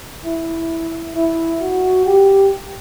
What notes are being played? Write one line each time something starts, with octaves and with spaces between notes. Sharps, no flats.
E4
E4
F#4
G4